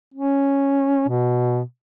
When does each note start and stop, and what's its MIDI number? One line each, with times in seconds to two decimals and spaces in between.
0.14 1.08 61
1.08 1.61 47